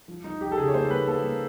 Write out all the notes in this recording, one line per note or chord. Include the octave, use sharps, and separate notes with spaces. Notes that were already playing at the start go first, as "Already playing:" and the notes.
F3
F3 D#4
F3 G4
A4
C#3 G#4
C#5
A#3 C5
A#3 B4
A#3 A4
A#3